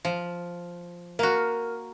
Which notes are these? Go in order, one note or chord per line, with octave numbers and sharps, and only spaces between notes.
F3
A#3 F#4 A#4